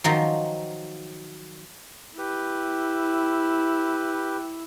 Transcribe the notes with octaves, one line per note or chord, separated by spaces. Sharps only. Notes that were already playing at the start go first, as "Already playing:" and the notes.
D#3 F3 F#3
E4 G4 B4